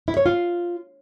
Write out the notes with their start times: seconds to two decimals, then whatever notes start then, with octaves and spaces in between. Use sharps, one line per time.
0.08 E4
0.17 C#5
0.26 F4